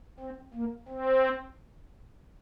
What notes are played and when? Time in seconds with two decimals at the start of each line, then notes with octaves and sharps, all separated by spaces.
0.20 C4
0.54 A#3
0.88 C4